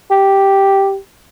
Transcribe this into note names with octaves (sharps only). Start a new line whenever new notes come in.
G4